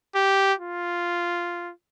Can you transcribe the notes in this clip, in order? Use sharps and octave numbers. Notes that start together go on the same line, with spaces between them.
G4
F4